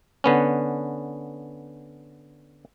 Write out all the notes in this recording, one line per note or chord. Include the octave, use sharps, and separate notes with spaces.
D3 B3 C#4